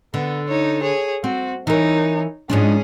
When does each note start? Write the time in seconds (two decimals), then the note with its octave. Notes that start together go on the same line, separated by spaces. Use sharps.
0.14 D3 B3
0.48 D#4 C#5
0.82 G#4 C#5
1.24 C4 F#4
1.67 E3 D#4 A#4 C#5
2.50 G#2 F3 C#4 D4 G#4